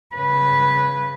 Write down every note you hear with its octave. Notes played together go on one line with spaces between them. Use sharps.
C#3 B4